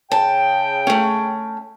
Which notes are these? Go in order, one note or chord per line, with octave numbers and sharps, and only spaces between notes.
C#3 G5 A5
A3 C#4